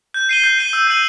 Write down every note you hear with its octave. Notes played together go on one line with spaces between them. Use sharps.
G6
C7 D#7 G7
G6
C7 D#7 G7
E6
G6 D#7 F#7